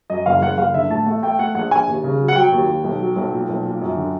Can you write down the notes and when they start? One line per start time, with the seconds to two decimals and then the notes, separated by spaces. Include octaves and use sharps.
0.10 F#2 D#5
0.26 F#1 F5
0.42 F#1 F#5
0.58 F#1 F5
0.74 D3 E5
0.90 A2 A5
1.06 A3
1.23 A3 G5
1.39 A3 F#5
1.55 A#1 F#5
1.71 A#1 G#5
1.88 D#2
2.04 C#3
2.20 F#3
2.28 F#5
2.36 F#3 G5
2.52 D#2
2.68 D#2
2.84 B1
3.00 F#3
3.16 B1
3.33 A#2
3.49 B1
3.65 A#2
3.81 F#2
3.97 D3